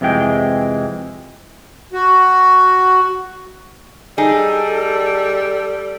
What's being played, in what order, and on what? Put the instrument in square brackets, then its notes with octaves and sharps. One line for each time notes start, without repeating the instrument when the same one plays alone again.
[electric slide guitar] F2 C3 E3 G#3 G5
[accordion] F#4
[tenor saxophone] G3 [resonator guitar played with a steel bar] D#4 G#4 [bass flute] A4